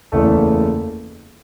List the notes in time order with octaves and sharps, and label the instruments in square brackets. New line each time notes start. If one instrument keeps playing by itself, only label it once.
[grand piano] F#1 E2 C#3 E3 A3 A4